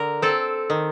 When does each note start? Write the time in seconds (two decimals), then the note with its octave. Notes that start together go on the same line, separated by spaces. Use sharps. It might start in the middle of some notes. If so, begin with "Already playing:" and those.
Already playing: D3 A#4
0.22 C4 A4
0.70 D#3